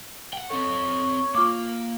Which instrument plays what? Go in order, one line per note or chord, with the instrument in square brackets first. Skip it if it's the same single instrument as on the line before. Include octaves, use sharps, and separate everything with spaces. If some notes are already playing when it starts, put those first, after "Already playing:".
[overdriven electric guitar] F#5 G5
[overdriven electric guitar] C4 A4 [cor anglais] C#5
[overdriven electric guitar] A#3 [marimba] F4 D6